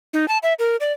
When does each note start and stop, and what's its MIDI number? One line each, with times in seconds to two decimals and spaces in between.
0.13 0.28 63
0.28 0.38 81
0.43 0.54 76
0.59 0.76 70
0.80 0.92 74